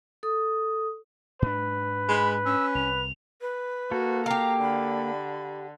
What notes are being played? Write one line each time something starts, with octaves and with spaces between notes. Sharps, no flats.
A4 D#6
G#2 D4 B4
G#3 B5
C#4 E6
C2 F7
B4
A#3 F#4 A4
G4 F5 A#5
D3 B5